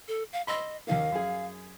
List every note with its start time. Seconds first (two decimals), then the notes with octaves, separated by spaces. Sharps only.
0.08 A4
0.33 F5
0.47 D#5 B5 C6 E6
0.87 D#2 D#3 A#3 F5
1.12 F#2 G#4